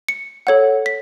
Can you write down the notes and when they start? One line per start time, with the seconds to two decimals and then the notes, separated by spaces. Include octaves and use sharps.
0.09 C#7
0.47 A4 C#5 F#5
0.86 B6